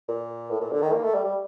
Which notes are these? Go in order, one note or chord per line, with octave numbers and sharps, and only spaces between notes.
A#2
A2
A#2
D3
D#3
A#3
A3
G3
G3